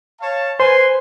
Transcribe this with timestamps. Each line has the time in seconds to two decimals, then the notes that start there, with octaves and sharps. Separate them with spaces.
0.21 C#5 F5 A5
0.60 B4 C5 G#5 C6